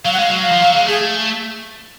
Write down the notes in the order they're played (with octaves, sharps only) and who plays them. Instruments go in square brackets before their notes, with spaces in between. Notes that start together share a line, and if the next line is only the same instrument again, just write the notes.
[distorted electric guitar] F#3 [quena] F5
[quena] F#5
[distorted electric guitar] G#3 [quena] F5
[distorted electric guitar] F#3
F3
F#3
G#3
[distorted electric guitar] A3 [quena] G#4